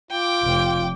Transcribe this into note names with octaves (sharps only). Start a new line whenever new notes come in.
F4 G5 D6
F1